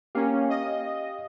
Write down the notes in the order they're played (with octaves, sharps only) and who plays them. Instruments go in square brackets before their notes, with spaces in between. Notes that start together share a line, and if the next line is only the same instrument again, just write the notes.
[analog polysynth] A#3 C#4 [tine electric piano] G4 F5
[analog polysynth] D#5